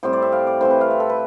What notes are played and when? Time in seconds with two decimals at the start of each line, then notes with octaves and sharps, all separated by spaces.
0.03 A2 G3 C4 C5
0.13 D5
0.22 E5
0.32 F5
0.47 D5
0.61 E3 A3 C4 C5
0.71 B4
0.81 F5
0.91 E5
1.00 A4
1.10 B4